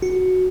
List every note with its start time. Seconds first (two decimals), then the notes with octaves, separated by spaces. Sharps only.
0.02 F#4